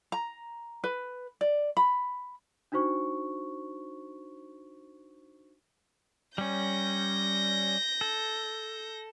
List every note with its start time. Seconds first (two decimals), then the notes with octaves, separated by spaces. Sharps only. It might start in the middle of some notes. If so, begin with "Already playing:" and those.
0.12 A#5
0.84 B4
1.41 D5
1.77 B5
2.72 D4 D#4 F#4 C5 C#6
6.38 G3 C#4 G6 A#6
8.01 A4